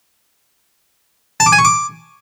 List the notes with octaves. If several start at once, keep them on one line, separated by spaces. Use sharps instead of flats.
A5
D6
G#5
C#6
D6